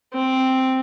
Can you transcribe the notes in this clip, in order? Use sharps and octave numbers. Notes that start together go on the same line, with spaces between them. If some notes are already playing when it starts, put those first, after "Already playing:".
C4